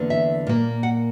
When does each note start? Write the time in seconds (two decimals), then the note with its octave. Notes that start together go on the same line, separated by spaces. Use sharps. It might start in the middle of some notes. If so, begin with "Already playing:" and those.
Already playing: E2 D3 A#3
0.10 E5
0.47 A#2 A#3
0.83 F#5